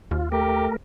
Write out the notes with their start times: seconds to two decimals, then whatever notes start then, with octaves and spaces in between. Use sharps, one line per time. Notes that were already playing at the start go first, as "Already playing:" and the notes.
0.11 D#2 F4
0.32 A3 G4 A#4